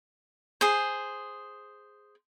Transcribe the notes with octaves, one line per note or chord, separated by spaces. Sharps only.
G#4 C5